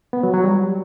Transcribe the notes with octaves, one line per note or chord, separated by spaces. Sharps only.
B3
F#3
F#3
G3